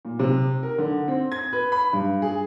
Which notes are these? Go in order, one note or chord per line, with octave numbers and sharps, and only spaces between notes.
A#2
C3
A#4
D3
C4
G#6
B4
B5
G2
G#4